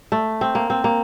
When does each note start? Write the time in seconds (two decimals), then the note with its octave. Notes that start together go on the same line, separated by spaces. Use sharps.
0.12 A3
0.41 C4
0.55 A#3
0.70 C4
0.84 A#3